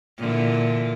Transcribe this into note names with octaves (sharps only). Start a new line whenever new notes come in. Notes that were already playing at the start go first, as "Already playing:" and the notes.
A#2 D3 E3